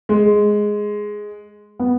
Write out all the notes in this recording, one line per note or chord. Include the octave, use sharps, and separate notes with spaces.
G#3
B3